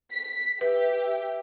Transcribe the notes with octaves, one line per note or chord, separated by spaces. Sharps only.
B6
G4 B4 E5